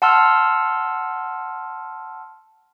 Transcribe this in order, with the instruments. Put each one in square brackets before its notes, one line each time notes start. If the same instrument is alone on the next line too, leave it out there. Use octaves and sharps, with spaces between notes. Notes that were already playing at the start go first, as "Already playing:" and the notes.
[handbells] F#5 A5 C6 E6 F6